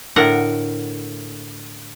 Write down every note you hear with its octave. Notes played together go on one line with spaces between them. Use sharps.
A2 D3 A#4 F#5